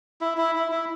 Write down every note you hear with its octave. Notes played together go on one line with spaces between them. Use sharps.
E4
E4
E4
E4